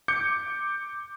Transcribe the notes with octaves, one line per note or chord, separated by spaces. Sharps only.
D6 G6 C#7